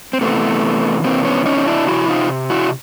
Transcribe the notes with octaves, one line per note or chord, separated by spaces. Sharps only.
C4
C3 E3 A3 B3
C3 E3 A#3 C4
B3 C#4
C#4 D#4
D#4
D4 E4
C3 D#3 E4 F#4
D#4 F4
E4 F#4